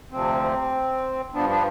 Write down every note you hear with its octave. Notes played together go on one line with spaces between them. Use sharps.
D2 C3 F3 C4
G2 F3 B3 D4
B3 D4